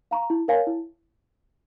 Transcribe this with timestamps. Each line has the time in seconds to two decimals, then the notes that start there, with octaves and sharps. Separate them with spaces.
0.11 F5 A#5 C#6
0.30 E4
0.48 A#4 C#5 F5 G#5
0.67 E4